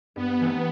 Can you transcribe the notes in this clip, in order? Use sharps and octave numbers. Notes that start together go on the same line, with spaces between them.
G2 B3
E3 A3 C4 D#4